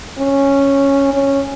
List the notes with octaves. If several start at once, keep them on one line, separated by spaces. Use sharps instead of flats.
C#4
C#4